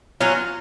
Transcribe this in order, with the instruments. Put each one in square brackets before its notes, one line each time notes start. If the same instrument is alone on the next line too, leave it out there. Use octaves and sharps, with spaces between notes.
[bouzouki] F#3 C#4 F4